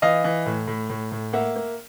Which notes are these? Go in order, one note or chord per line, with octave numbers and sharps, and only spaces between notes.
E3 D#5 F5
E3
A2
A2
A2
A2
A#3 E5 F#5
A#3